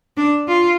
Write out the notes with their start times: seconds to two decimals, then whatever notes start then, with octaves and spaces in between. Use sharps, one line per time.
0.17 D4
0.48 F4